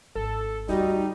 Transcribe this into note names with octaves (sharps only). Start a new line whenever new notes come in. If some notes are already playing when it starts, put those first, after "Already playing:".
G#1 A4
D2 G3 D#4 F#4